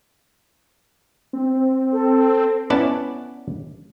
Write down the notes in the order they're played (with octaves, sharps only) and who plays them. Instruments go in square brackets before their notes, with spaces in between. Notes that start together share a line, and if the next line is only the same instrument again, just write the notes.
[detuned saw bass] C4
[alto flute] A4
[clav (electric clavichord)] B3 C#4 E4 D5 F#5 A5